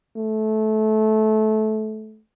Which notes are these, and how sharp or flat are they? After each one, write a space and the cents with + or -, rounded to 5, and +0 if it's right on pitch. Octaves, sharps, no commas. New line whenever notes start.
A3 -20